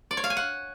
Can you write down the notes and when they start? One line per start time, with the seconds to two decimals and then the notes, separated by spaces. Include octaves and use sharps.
0.11 D5
0.17 C#5
0.24 F5
0.30 G#5
0.37 F#5